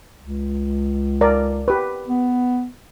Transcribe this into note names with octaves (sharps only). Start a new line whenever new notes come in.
C#2
A#4 D5
G4 B4
B3